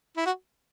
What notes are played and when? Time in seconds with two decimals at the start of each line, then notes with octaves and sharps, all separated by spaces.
0.17 E4
0.26 F#4